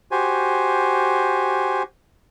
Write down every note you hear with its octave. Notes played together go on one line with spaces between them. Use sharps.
F#4 G4 C5 G#5